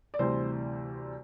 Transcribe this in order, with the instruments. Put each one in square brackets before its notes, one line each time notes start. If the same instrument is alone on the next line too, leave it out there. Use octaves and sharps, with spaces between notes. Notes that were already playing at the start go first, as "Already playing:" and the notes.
[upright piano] D5
D2 C3 E3 G3 C5